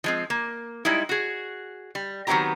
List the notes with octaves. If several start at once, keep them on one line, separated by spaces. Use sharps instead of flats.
F3 G#3 C4
A#3
G3 G#3 D#4 E4
F#4 G#4
G3
D#3 F#3 B3 C4 G4 A#5